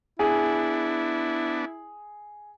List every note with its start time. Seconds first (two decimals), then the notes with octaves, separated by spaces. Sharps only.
0.19 B3 D4 E4 G#4